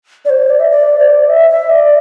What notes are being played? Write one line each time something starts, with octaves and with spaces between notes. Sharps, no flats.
D5
C5
D5
E5
D5
C5
D5
E5
E5
D5